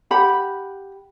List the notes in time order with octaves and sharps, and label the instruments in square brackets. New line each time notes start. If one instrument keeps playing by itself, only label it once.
[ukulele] G4 F#5 B5